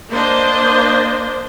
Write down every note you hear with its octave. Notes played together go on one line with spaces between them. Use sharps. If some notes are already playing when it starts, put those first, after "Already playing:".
A#3 D4 C5 D#5